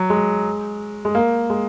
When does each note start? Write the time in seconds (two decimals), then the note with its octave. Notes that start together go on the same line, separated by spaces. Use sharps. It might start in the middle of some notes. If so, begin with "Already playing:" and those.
Already playing: F#3
0.10 G#3
1.05 G#3
1.15 A#3
1.50 G#3